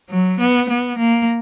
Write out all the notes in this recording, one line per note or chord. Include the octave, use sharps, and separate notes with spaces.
F#3
B3
B3
A#3